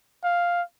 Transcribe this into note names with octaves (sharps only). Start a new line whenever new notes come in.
F5